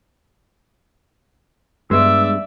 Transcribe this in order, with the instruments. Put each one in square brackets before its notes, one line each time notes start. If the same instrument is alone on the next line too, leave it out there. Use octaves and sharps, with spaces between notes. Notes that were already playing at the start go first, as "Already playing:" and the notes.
[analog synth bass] G2 [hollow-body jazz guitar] G#3 B3 [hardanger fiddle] D5 E5 [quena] E6